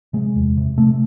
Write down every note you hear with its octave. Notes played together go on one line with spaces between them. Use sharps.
C3 G#3
E2
C3
C3 A3